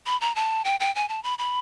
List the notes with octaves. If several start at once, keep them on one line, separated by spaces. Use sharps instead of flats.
B5
A#5
A5
G5
G5
G#5
A5
B5
B5